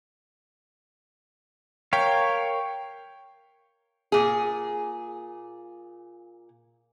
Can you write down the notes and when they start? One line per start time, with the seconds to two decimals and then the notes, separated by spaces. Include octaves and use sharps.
1.93 A#4 C#5 F5 G5 B6
4.12 A#2 G#4